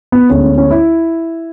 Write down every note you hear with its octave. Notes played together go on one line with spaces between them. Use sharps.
B3
D2 D3 G#3 B3 C#4
C#4
C#4
E4